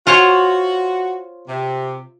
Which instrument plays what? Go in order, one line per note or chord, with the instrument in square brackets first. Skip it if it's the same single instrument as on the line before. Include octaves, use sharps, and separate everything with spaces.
[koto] F4 C5 C#5 [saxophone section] F#4
[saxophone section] C3